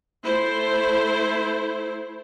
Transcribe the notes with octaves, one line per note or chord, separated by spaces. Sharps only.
A3 E4 C5